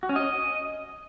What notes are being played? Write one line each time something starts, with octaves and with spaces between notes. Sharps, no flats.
F#4
C#4
D#5